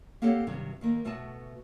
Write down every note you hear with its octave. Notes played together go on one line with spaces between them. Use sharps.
A#3 C4 G4 A4 C#5 F#5
G2 C3 D#3 F#3
D#2 D#3 A#3
B2 A3 B3 F#4 E5 A5